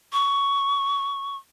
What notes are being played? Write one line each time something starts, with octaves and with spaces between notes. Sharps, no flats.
C#6